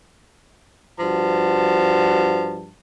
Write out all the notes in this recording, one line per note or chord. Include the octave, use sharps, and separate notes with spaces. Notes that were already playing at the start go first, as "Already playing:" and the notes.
G2 F3 F#4 A5